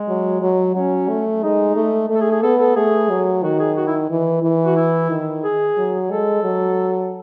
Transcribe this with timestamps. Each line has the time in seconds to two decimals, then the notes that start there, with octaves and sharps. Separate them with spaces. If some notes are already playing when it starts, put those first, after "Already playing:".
Already playing: G#3
0.08 F#3
0.42 F#3
0.75 F#3 C#4
1.09 A3
1.43 G#3 D#4
1.75 A3
2.10 A3
2.15 A4
2.20 G#4
2.32 G#4
2.43 B3 A4
2.59 A4
2.76 A3 G#4
3.10 F#3
3.43 D#3 F#4
3.60 G#4
3.76 F#4
3.88 E4
4.10 E3
4.43 E3
4.65 F#4
4.76 E4
5.10 D#3
5.44 G#4
5.77 F#3
6.10 G#3 A4
6.43 F#3